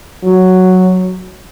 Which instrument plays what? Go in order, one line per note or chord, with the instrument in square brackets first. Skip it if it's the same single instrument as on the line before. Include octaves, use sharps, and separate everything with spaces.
[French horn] F#3